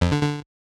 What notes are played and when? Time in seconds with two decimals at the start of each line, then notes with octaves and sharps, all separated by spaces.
0.01 F2
0.12 D3
0.23 D3